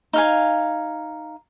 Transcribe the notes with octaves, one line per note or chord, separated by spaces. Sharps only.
D#4 F5 G#5